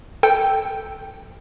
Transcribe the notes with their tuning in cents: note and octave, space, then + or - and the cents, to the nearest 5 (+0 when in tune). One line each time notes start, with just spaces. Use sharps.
A4 +0 G5 +0